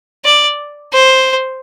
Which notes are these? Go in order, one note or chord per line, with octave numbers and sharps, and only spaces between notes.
D5
C5